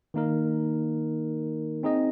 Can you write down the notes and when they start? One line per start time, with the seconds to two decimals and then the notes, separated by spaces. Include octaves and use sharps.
0.14 D#3 A#3 D#4 A#4
1.83 C4 D#4 G#4 D#5